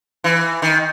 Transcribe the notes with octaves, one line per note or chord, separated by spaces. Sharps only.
E3
D#3